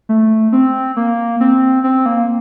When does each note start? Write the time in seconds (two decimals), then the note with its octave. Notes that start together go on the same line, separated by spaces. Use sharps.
0.09 A3
0.52 C4
0.96 A#3
1.40 C4
1.84 C4
2.06 A#3